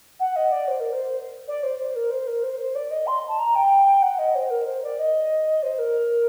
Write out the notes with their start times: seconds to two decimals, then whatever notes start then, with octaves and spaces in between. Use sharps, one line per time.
0.20 F#5
0.36 D#5
0.52 D5
0.68 C5
0.80 A#4
0.92 C5
1.48 D5
1.63 C5
1.79 C5
1.95 A#4
2.11 C5
2.27 A#4
2.43 C5
2.60 C5
2.75 D5
2.91 D#5
3.07 C6
3.28 A5
3.39 A#5
3.55 G5
4.02 F#5
4.19 D#5
4.35 C5
4.50 A#4
4.67 C5
4.83 D5
4.99 D#5
5.63 C5
5.79 A#4